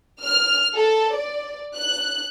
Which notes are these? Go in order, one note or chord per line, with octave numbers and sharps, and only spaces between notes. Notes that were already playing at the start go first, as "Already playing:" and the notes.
F6
A4
D5
F#6